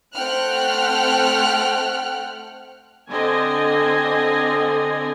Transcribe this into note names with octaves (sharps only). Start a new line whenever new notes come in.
A3 C4 F#5 G5 F6 F#6
D3 C4 D#5 G#5